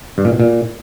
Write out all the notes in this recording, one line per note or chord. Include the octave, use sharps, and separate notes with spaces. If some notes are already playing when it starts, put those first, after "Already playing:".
G2
A#2
B2
A#2